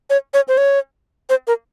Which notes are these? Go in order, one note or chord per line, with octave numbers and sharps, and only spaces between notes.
C#5
C#5
C5
C#5
C5
A#4